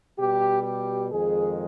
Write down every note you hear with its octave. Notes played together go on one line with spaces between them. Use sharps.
B2 G3 G4
G4
F2 D#3 G#3 G#4